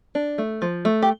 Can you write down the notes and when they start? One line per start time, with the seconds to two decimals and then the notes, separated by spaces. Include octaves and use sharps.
0.15 D4
0.38 A3
0.62 F3
0.85 A3
1.02 G4